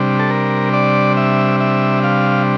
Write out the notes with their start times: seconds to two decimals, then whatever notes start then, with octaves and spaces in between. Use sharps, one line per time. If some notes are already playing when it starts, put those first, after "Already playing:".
Already playing: C3 G3 D4
0.19 A4
0.30 A#4
0.74 D5
1.17 E5
1.61 E5
2.04 F5